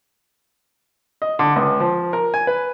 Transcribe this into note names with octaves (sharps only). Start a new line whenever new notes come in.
D#5
D3
C#2
F3
A#4
G#5
B4